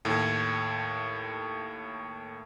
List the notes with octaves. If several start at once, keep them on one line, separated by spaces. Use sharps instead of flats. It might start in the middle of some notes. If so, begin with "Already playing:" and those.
D#2 A2 A3